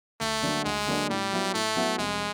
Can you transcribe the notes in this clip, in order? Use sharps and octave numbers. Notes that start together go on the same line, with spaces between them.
D2 A3
D3 F#3 A#3 D4
D2 G#3
D3 F#3 A#3 D4
A2 G3
F#3 B3 E4
A2 A3
F#3 B3 E4
F1 G#3